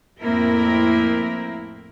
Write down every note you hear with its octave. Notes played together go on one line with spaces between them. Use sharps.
F2 A2 A#3 C4 E4 A#4